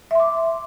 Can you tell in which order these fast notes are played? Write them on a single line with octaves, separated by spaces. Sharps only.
E5 C6 D6